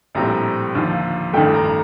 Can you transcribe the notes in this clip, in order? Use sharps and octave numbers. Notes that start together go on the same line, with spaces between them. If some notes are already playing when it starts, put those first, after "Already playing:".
A#1 A2 G3 C4 A#5
D#2 D3 F3
A1 G2 D#3 A3 G5
A#5
A#5